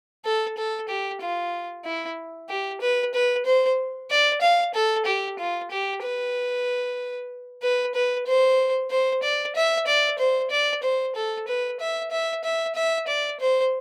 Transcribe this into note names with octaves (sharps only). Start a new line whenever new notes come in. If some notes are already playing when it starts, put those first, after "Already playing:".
A4
A4
G4
F4
E4
G4
B4
B4
C5
D5
F5
A4
G4
F4
G4
B4
B4
B4
C5
C5
D5
E5
D5
C5
D5
C5
A4
B4
E5
E5
E5
E5
D5
C5